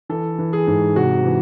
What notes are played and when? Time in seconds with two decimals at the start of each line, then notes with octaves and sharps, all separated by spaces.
0.09 E3 A4
0.39 E3
0.53 G#4
0.67 G#2
0.96 C3 F#4
1.24 E3